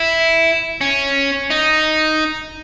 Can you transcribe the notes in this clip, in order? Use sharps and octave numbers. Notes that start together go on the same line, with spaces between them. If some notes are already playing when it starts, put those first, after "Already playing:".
Already playing: E4
C#4
D#4